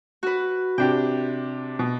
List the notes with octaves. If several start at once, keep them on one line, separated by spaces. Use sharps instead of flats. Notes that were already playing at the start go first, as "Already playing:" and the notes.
F#4 B4
C3 D4 G4 G5
B2